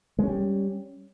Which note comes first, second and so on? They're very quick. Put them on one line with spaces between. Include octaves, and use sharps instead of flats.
G#3 C#4 G3